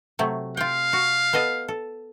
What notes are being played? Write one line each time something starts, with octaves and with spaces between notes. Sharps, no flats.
C3 F#3 A3
F4 F5 G5
F#4
B3 A4 D#5
A4